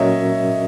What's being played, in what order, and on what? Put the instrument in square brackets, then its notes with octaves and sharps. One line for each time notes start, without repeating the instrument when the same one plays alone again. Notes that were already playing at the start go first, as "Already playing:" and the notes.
Already playing: [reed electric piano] A#2 F#3 C#4 F#4 A#4 [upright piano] C#5 D#5 E5